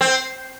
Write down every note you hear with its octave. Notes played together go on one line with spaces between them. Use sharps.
C4